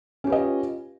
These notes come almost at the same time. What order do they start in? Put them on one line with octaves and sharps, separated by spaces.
C#4 G4 B4 D#5 F4